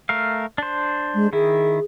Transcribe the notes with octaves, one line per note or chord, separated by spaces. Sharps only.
A3 A#4 F5
D4 C5
G#3
D#3 E4 G#4